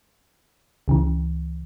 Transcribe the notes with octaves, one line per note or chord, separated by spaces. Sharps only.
C#2 C#3 E3